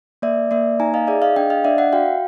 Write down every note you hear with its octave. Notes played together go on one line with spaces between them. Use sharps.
A#3 D5 E5
A#3 D5 E5
D#4 G#5 A#5
D#5 F5
G#4 D5 E5
D#5 F5
D4 F5 G5
D#5 F5
D4 D5 E5
E5 F#5
F#4 F5 G5